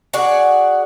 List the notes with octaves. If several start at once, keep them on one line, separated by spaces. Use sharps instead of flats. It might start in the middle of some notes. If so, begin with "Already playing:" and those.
F#4 G#4 D5 F#5